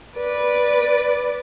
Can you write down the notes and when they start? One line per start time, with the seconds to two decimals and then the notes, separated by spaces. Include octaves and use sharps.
0.16 B4 D5